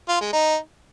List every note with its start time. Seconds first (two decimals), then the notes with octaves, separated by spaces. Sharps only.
0.09 F4
0.21 G#3
0.33 D#4